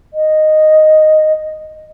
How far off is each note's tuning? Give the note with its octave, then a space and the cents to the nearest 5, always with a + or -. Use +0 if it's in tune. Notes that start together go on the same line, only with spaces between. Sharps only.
D#5 -5